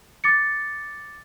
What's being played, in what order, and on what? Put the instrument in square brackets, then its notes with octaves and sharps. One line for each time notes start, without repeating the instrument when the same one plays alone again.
[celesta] D6 A6 C#7